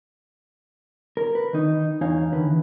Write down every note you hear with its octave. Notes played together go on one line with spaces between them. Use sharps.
A#4
B4
D#3 D#4
E2 D#4 C#5 F5 G#5
D#2 D3 E3 B4